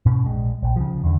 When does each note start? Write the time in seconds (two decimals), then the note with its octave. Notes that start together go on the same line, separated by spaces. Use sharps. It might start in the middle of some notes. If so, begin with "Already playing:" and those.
0.06 G#2 B2 C#4
0.26 A#1 G#3
0.62 A#1
0.76 C#3 F3
1.04 E2 D3